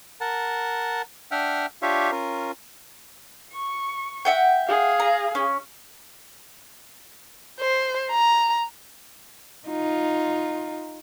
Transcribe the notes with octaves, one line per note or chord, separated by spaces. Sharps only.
A#4 F#5 A5
D4 E5 F#5 G5 F6
D4 F4 G4 C#5 E5 F5
C#4 F4 A#4
C#6
E5 F#5 G5
G#4 F5
A#5
C#4
C5
A#5
D#4 F4